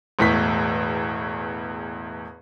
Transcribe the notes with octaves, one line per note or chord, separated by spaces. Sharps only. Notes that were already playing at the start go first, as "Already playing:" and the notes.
E1 E2 A2 B6